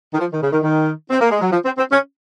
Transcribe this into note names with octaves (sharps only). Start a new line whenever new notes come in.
D#3
F3
D#3
C#3
D#3
D#3
C4
A#3
G#3
F#3
F3
C4
C4
C#4